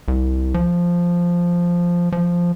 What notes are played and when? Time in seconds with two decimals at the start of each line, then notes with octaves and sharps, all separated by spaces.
0.08 C2
0.54 F3
2.12 F3